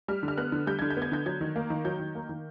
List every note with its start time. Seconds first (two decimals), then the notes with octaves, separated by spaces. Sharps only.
0.08 G3 F6
0.23 D3
0.28 F6
0.38 B3 F#6
0.52 D3
0.67 G3 G6
0.79 D3 G#6
0.90 G6
0.97 B3
1.02 G#6
1.12 D3 G6
1.26 F#3 G#6
1.41 D#3
1.56 A#3
1.70 D#3
1.85 F#3 G6
1.99 D#3
2.15 A#3
2.29 D#3